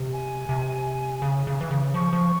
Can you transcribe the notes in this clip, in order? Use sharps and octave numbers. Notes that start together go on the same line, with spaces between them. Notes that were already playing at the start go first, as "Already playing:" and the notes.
Already playing: C3
G#5
C3
C#3
C#3
E3
C#3
F3 C#6
F3